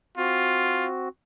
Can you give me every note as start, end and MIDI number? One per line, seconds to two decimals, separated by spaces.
0.18 1.09 60
0.18 0.87 65
0.18 1.09 66